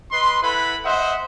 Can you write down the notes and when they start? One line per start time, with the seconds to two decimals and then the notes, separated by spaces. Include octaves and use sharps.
0.12 B4 D#5 C6
0.43 E4 A4 B4 F#5 B5
0.85 C5 D#5 E5 F#5